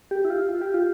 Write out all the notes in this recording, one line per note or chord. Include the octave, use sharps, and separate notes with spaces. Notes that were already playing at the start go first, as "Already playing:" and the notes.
G4
E4
F4
F4
G4
F4